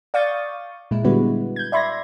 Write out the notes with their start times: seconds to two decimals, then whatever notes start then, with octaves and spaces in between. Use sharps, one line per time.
0.14 D5 F5 C#6 D#6 G6 A6
0.91 A#2 G#3 E4
1.04 D3 G3 G#3 B3 F#4 B4
1.56 G6 G#6
1.72 D5 E5 B5 C6 G#6 A#6